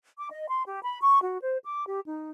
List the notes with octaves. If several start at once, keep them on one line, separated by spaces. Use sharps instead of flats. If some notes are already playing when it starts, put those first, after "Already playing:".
D6
D#5
C6
G4
B5
C#6
F#4
C5
D6
G4
D#4